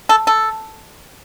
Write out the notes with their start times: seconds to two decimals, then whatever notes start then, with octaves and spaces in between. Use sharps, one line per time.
0.09 A4
0.27 A4